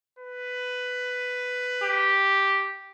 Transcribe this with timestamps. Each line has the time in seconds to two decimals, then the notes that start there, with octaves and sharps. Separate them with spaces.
0.19 B4
1.82 G4